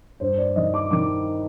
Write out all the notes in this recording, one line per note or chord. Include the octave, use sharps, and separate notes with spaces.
G2 C5
D5
D#3 D#5
D6
D#3 D6